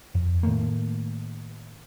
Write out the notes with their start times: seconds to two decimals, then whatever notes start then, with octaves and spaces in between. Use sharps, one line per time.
0.15 F2
0.43 A2 D#3 A3 A#3